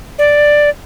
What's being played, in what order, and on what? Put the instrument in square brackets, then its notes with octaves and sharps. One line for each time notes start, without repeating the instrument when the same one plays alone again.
[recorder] D5